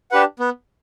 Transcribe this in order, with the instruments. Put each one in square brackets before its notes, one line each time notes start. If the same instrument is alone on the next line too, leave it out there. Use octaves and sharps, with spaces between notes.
[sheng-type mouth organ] D4 G4 B4 F#5
B3